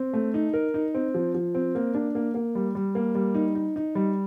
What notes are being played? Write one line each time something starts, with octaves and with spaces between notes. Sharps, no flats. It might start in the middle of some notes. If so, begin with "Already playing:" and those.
Already playing: C4
A3
D#4
A#4
D#4
C4
F3
F3
C4
A#3
D4
A#3
A#3
G3
G3
A#3
G3
D#4
D#4
D#4
G3